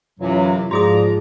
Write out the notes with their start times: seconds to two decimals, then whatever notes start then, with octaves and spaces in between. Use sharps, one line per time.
0.20 F#2 C3 E3 F#3 F4 C#5
0.71 G#2 F3 F#4 G#4 D5 A#5 D#6